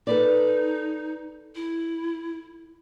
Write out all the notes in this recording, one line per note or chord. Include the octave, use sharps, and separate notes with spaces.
D#4 A4 B4 D5
E4